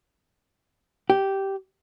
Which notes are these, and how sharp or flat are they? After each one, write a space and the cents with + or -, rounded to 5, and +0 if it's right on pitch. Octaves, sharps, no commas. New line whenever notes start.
G4 -10